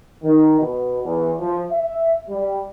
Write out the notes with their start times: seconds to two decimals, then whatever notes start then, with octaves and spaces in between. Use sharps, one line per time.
0.23 D#3
0.60 B2
1.03 E2
1.40 F3
1.72 E5
2.30 G3